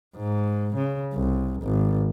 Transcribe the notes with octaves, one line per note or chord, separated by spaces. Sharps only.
G#2
C#3
C2
G#1